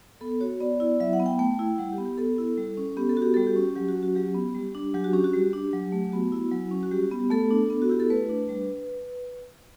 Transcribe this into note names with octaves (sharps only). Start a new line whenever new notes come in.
B3 A4
F#4 C#5
B3 D5
E4
F#3 E5
F#5
B3
G5
A3 G5
E4
G3 F#5
G4
B3
G4
B3 A4
E4
G3
C#4
B3 G4
A4
F#4
G4
G3 A4
G4
C#4
F#3 G4
F#4
C#4
F#4
F#3 G4
B3
G3
D4
F#3 G4
F#4
C#4 G4
F#4
G3 G4
D4
F#3
A3
B3 F#4
E4
F#3
C#4
F#4
G3 G4
B3
A3 A4
D4
B3
F#4
E4 G4
A4
A3 B4
D4
G3